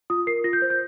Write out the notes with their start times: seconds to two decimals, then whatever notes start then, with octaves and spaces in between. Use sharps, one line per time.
0.10 F4 D#6
0.27 A#4 C7
0.44 F4 A#6
0.53 G6
0.62 C5
0.70 G6